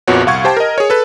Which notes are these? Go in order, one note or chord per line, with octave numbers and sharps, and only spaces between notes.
A#1 F2 A#2 B3 F#4 C#5
C2 F5 F#5 C#6 G#6
G4 C5 G5 A5
A#4 D#5
G#4 C#5
A4 B4